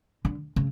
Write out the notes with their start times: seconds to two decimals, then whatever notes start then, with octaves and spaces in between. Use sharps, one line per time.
0.25 D3
0.56 C#3